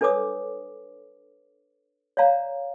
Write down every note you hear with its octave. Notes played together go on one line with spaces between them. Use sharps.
D4 A4 B4 C#5 D6 D#6
C#5 D5 F5 A#5